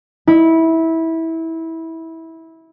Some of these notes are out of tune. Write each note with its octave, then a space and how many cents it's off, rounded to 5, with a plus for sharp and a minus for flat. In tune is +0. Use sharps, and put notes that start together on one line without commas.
E4 -20